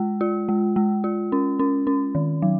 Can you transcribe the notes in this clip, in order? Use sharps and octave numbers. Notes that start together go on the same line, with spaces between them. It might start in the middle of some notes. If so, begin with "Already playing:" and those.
Already playing: G#3
F4
G#3
G#3
F4
C#4
C#4
C#4
D#3
F#3